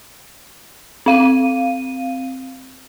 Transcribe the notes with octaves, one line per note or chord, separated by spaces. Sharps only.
C4 F5 D#7